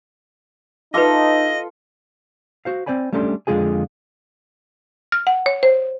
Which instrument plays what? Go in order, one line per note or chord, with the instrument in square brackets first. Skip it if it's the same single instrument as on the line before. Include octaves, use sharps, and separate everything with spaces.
[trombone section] D#4 [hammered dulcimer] F4 A4 [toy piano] B4 D6 [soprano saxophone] D#5
[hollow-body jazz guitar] F#4 C5 F5
C4 C5 D5 G#5 B5
G3 A3 C#4 D4 A4 C6
F2 D3 G#3 F4 G#4 G#5
[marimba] F6
F#5
C#5
C5